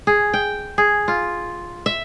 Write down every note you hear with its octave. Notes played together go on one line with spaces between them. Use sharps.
G#4
G5
G#4
F4
E5